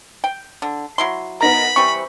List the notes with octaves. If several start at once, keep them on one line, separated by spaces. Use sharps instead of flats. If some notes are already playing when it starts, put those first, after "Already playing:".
G5
D3
F#3 E4 C6
B3 D#4 A#4 A#5 B5 A#6
E3 G3 C4 C#6